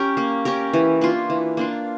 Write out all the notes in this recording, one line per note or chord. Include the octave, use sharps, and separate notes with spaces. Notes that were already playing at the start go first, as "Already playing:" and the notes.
Already playing: C#4 G4 A#4
A#3
C#4 G4 A#4
E3
A#3 D4 F4
E3
A#3 D4 F4